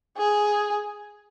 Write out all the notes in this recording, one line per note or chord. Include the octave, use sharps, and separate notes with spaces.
G#4